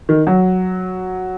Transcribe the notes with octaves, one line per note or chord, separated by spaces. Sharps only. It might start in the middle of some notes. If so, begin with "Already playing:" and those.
D#3
F#3